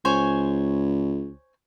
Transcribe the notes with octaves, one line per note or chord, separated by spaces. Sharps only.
C#2 C5 C#5 G#5